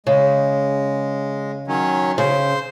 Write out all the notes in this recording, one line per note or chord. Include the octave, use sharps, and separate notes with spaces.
C#3 G#3
D#3 F#3 C#4
C#3 C5